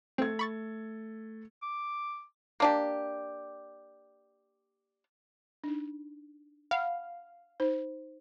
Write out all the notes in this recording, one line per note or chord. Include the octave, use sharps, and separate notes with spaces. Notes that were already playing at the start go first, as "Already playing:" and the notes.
A3 C4 A4 G#6
B5 C#6 A6
D6
A#3 D4 G4
D4 D#4
F5 F#5 B5
D#4 C5